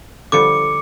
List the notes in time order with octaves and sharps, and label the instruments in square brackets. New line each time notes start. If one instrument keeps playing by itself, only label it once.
[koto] D3 F3 G3 [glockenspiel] D6 C#7